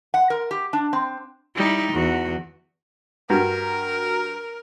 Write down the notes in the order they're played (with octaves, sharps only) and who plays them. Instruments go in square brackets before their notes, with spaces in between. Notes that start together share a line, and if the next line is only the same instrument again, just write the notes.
[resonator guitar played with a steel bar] F#5
A#4
G4
D4
C4
[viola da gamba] G3 D#4 E4
E2 F#4
[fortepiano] G2 [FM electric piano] F#4 A#5 [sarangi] A#4